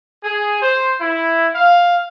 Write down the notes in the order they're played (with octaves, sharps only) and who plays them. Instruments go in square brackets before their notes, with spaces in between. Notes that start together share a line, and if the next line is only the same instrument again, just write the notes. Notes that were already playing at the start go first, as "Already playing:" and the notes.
[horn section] G#4
C5
E4
F5